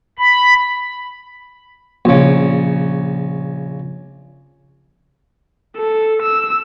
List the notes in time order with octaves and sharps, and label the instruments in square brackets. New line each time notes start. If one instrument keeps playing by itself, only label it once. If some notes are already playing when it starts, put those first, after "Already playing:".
[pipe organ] B5
[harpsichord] A#1 C#3
[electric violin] A4
E6